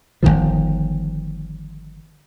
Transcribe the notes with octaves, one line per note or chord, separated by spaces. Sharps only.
G1 E2 D#3 F3